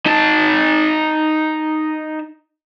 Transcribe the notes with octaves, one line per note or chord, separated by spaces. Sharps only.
D#4 A5